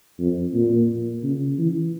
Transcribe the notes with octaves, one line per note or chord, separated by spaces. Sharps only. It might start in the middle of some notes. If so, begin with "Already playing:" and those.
F2
A#2
C#3
E3